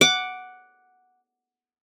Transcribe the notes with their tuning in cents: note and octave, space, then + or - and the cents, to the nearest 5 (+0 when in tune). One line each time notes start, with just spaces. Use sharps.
F#5 +0 D6 -5